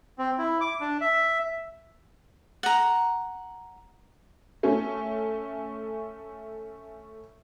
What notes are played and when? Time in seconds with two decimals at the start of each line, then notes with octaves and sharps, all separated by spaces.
0.18 C4
0.38 E4
0.61 D6
0.80 D4
1.01 E5
2.63 F#5 A#5
4.63 A3 C#4